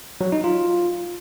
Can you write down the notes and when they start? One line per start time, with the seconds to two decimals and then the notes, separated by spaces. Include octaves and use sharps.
0.21 F#3
0.32 D#4
0.44 F4